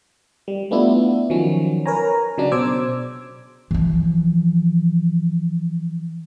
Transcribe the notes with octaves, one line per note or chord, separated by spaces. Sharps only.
G3
A3 B3 D4 E4 F4
D#3 F3 F#3 C#4
A#4 B4 C#5 G#5 A#5
C#3 F#3 D4
B2 C5 D6 E6 G#6
E3 F3